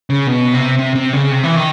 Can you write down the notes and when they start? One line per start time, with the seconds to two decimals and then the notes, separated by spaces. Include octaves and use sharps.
0.10 C#3
0.27 B2
0.53 C3
0.79 C3
0.96 C3
1.13 C#3
1.31 C3
1.43 E3
1.56 D#3